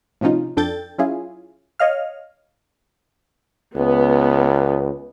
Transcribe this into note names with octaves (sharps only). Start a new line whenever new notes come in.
A2 C3 F3 C#4 D#4 F4
F2 D4 A4 G5 G6 A6
F#3 C#4 E4 F4 G#4
C#5 D#5 F5 F6
C#2 B3